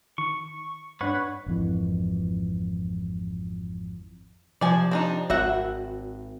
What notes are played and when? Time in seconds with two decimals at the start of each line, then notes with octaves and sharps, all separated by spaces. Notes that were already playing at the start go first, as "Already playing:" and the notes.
0.18 D#3 C#6
1.01 G2 D4 B4 C#5 F#5
1.46 G#1 F2 E3
4.61 C3 F3 D5 G#5
4.91 C4 D4 D#4
5.30 G#1 F#4 E5 F#5